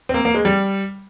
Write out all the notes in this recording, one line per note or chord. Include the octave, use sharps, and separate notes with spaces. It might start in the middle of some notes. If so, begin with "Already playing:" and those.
C4
A#3
A#3
G#3
G3